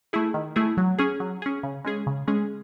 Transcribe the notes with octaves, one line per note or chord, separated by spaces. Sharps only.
A3 E4 G#4
D#3
A3 E4 G#4
F#3
C#4 G#4
F#3
C#4 G#4
C#3
G#3 C#4 G#4
C#3
G#3 C#4 G#4